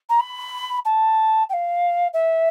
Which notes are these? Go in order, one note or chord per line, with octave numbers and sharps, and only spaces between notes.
A#5
B5
A5
G5
F5
E5